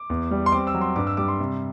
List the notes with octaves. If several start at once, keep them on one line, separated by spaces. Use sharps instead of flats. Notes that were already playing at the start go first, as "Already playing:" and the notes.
Already playing: D6
E2
G3
C6
C4 D6
E6
F#3
C6
G2 D6
E6
G3 D6
C6
C3